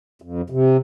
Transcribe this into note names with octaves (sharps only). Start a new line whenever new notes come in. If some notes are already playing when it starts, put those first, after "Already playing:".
F2
C3